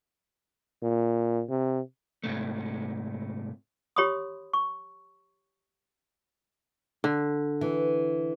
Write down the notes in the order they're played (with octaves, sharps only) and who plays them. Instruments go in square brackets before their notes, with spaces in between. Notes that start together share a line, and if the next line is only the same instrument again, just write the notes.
[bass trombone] A#2
C3
[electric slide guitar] G#2 C3 A3
[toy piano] G4 C#5 B5 C6 D#6
C#6
[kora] D3
[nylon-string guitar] E3